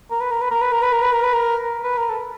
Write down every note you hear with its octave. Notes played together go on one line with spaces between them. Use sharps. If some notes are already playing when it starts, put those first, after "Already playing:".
A#4
B4
A#4
B4
A#4
B4
A#4
B4
A#4
B4
A#4
B4
A#4
B4
A#4
A4